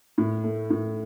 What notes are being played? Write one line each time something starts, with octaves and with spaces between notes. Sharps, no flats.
A2
A3
A2